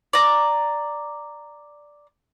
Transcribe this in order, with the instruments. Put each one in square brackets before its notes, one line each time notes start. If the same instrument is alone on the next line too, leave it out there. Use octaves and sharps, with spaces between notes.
[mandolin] D5 A#5